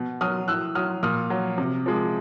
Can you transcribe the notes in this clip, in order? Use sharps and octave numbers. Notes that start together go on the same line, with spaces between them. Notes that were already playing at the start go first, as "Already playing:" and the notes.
Already playing: B2
F#3 D#6 F6
A2 E6 F#6
F#3 D#6 F6
A#2 D#6 F6
F#3
C3
F3 G#3